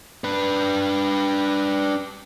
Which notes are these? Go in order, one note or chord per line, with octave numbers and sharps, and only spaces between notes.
D4 B4